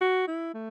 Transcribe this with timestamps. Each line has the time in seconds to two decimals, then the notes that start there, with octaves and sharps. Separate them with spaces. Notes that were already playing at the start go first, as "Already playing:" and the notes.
0.01 F#4
0.28 E4
0.54 A3